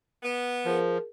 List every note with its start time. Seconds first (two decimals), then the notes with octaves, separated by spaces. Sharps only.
0.23 B3
0.65 F3 G#4 A#4